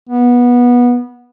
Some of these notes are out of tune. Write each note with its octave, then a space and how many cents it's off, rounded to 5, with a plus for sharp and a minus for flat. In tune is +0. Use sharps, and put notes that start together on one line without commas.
B3 -20